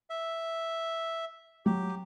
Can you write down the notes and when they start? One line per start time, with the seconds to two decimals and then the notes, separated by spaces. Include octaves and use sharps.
0.10 E5
1.66 F#3 F#4 G4